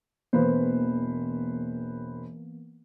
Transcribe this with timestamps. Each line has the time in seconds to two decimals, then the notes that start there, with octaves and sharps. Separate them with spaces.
0.33 E1 E3 A#3 B3 B4 C5